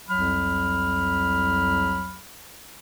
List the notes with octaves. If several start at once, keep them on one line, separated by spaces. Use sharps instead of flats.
C2 F2 F#3 B5 F6